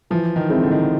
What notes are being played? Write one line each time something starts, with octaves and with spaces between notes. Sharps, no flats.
E3 F3
D#3
G#3 C4 E4
D3
D#3
D3